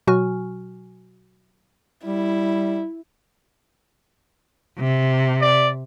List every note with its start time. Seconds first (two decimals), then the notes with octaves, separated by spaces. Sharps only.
0.07 B2 F#3 F#4 G#5 C#6 F6
2.05 G3 E4
4.79 C3
5.41 D5